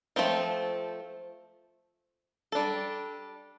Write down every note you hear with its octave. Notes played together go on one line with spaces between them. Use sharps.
F3 A3 C4 F4
G3 D4 A4